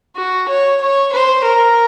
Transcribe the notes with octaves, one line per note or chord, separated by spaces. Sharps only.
F#4
C#5
C#5
C5
A#4